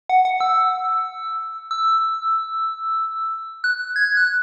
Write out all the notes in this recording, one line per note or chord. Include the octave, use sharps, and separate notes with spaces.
F#5
F#5
E6
E6
F#6
G#6
F#6